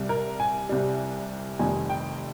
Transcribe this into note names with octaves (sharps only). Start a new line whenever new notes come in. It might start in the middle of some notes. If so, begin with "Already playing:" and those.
Already playing: C2 C3 G3
A#4
G#5
C2 C3 G3
F1 F2 C3 D#3 G3 G#5
G5